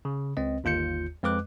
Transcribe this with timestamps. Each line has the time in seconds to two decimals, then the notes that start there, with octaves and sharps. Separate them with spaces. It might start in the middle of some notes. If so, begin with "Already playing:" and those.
0.05 C#3
0.37 C#2 C4 D#5
0.64 G1 D#2 F4 G6 C#7
1.23 F2 G#3 B4 D6 F#6